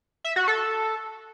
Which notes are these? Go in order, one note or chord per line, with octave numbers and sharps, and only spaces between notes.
E5
F#4
A4